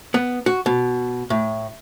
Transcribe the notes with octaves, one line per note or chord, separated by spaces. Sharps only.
B3
F#4
B2
A2